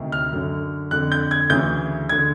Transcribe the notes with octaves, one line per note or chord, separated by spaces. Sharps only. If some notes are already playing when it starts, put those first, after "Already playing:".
Already playing: D2 C3 D#3
F6
F#2 D3
F2 D3 F#6
G6
G#6
D2 C#3 E3 G6
D3 G#6